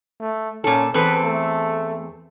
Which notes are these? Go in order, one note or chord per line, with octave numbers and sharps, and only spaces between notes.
A3
A#2 C#4 A4
E2 C4 A4 B4
A3